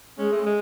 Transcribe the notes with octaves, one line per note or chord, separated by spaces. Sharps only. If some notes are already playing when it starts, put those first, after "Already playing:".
G#3 C#4
A3
G#3